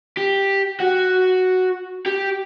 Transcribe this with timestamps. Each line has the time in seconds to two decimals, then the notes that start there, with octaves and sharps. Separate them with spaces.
0.17 G4
0.80 F#4
2.06 G4